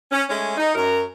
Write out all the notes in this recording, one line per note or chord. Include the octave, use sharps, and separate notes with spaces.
C#4
G#3 A3 C#4
D#4
F#2 A#4